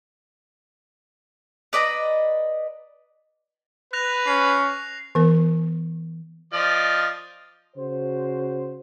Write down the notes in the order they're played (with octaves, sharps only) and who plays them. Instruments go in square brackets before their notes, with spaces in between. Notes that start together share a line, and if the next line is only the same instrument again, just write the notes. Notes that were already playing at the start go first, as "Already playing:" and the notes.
[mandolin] B4 D5 D#5 A#5
[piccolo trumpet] B4 [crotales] F#6 A#6 F7
[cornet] C#4 [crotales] C7
[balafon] E3 B3 A#4
[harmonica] F3 D5 D#5
[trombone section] C#3 F#4 C5